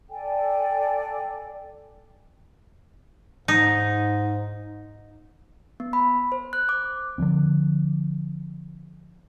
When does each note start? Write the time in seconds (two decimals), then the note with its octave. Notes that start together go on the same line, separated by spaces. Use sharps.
0.10 A4 D5 G5 G#5
3.48 G#2 D#4
5.80 B3
5.93 B5
6.32 C5
6.53 F#6
6.69 D6
7.18 D3 E3 F3 C4